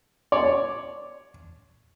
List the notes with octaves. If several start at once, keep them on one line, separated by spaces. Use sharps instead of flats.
C#5 D5